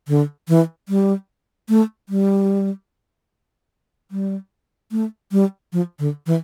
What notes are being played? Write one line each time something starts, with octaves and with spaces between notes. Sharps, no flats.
D3
E3
G3
A3
G3
G3
A3
G3
F3
D3
E3